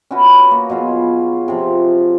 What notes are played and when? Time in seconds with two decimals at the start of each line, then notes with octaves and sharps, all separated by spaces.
0.11 C#4 E4 F#4 B4
0.51 A#3
0.70 B2 F#3 F4 G#4
1.48 C3 F3